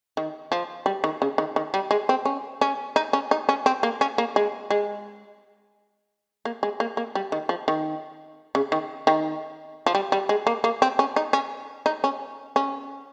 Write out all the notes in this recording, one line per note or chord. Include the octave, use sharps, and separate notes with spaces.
D#3
F3
G3
D#3
C#3
D#3
D#3
G3
G#3
C4
C#4
C#4
D#4
C#4
D#4
C#4
C4
A#3
C#4
A#3
G#3
G#3
A#3
G#3
A#3
A#3
G3
D#3
F3
D#3
C#3
D#3
D#3
F3
G3
G3
G#3
A#3
A#3
C4
C#4
D#4
C#4
D#4
C#4
C#4